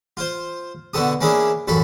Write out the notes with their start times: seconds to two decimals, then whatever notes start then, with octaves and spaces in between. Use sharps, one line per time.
0.17 F4 C5
0.94 B2 D3 B3 A4 D#6
1.21 A#3 C#4 D4 E4 G#4
1.68 A1 F#2 A4 B5